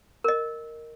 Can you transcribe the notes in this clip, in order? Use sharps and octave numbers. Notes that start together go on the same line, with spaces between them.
A#4 D#5